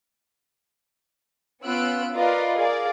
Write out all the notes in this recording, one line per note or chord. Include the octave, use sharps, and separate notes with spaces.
B3 C#4 F4 E6 F#6 D7
F4 A#4 B4 D5 D#5 F5
G#4 A#4 D5 F5